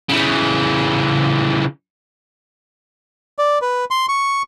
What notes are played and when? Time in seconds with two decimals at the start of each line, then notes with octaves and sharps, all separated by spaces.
0.09 C#3 E3
3.39 D5
3.62 B4
3.91 C6
4.09 C#6